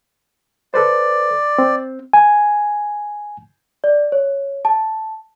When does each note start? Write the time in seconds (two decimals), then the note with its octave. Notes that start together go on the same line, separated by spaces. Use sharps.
0.74 A4 B4 C5 D5
1.58 C4
2.13 G#5
3.84 D5
4.12 C#5
4.65 A5